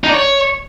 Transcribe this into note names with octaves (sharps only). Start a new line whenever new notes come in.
D#4
D5
C#5